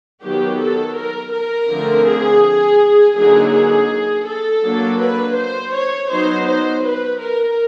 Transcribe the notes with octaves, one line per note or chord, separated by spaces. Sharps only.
D#3 F#3 B3 G4
A4
A#4
A#4
D3 F3 A3 C4
G#4
D3 F#3 A#3 D#4 G#4
G#4
A4
F#3 A#3 D4
B4
C5
C#5
F#3 B3 D#4 C5
C5
B4
A#4